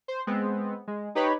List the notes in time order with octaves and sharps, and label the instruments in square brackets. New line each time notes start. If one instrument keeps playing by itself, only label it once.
[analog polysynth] C5
G#3 B3 C4
G#3
D#4 G4 B4 C#5 B5